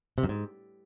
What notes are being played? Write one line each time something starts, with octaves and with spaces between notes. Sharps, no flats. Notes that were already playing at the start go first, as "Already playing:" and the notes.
C3
F#2
G#2